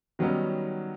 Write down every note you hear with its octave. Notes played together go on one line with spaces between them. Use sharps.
D#3 F#3 G3 B3 C#4 D#4